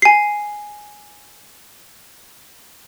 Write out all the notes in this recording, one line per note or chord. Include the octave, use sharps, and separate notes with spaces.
G#5 C7